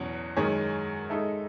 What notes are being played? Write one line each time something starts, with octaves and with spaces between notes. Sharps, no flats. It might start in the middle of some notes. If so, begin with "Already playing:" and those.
Already playing: E2 B2 F#3 C#4
F#2 D#3 G#3 C#4
G#3 D#4 A4 E5